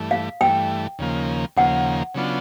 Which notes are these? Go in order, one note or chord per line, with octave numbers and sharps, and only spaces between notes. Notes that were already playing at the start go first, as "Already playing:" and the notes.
Already playing: G2 E3 A3
F5
G2 E3 A3 G5
D#2 C#3 F3 A#3
D#2 C#3 F3 A#3 F#5
C#3 F#3 B3 D4 F4